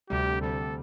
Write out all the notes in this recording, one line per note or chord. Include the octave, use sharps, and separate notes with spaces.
D2 C3 G3 G4
D2 C3 G3 A4